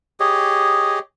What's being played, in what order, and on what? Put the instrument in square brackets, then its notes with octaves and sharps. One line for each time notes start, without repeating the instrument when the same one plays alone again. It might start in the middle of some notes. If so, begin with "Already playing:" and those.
[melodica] G4 G#4 C#5 D#5